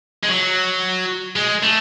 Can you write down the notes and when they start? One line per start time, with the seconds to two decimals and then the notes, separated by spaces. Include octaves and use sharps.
0.23 G#3
0.29 F#3
1.36 G#3
1.63 A3